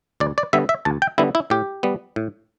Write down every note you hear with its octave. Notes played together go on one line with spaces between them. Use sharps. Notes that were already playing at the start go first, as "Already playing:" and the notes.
D2 D5
D5
D3 G3 B3 E5
E5
D2 A5
G5
D3 G3 B3 E4
E4
A2 G4
G3 B3
A2